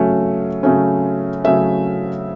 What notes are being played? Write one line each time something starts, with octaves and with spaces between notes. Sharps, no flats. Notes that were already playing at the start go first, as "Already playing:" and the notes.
Already playing: C#3 F#3 A3 C#4
C#3 F#3 A3 C#4
C#3 F#3 A3 C#4 E5